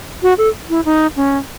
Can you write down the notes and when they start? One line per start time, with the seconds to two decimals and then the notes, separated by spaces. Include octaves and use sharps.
0.23 F#4
0.38 A4
0.70 E4
0.85 D#4
1.16 C#4